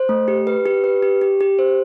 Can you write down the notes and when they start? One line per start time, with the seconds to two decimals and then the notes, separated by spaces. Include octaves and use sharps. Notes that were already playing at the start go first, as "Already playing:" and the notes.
Already playing: C5
0.09 A3
0.28 G4
0.47 B4
0.66 G4
0.84 B4
1.03 G4
1.21 G4
1.41 G4
1.59 C5